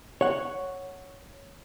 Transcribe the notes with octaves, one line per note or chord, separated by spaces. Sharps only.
C#5 F#5